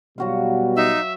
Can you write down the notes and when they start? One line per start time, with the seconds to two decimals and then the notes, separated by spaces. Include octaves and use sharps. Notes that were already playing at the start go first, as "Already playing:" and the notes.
0.18 B2 F#3 G3 F#4 F5
0.76 D#4 E5